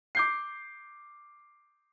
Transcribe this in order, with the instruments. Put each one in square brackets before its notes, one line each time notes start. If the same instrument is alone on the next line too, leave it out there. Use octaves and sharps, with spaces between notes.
[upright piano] D6 G6 C7